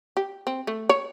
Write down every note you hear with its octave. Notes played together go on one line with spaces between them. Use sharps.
G4
C4
A3
C#5